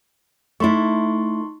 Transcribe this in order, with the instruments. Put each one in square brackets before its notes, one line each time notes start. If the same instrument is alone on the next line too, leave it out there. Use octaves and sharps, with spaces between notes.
[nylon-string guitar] A3 E4 [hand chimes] D#4 C6 C#6